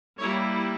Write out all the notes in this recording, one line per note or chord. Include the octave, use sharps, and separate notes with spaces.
G3 A#3 E4 C#5